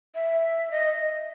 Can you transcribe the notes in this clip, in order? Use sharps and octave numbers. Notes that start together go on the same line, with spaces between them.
E5
D#5